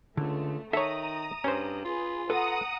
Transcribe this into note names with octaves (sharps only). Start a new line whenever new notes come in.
C#2 D3 A3
D#3 A4 C#5 E5 A#5 D#6
G2 C#4 C5
F4 G#4 B4
A4 B4 F#5 A#5 D#6